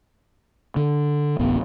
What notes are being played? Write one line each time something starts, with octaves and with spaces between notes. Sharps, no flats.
D3
D1 A1 B3